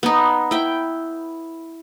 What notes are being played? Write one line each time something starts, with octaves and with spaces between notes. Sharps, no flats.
B3 D#4
E4 G5